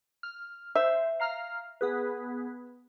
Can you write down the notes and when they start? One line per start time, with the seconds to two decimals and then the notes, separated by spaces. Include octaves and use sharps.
0.23 F6
0.75 C5 E5
1.20 F5 A#5 F6
1.81 B3 G#4 B4